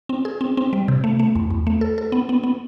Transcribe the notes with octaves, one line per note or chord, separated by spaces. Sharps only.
C4
G#4
C4
C4
G3
C3
A3
A3
E2
E2
A3
A4
A4
B3
B3
B3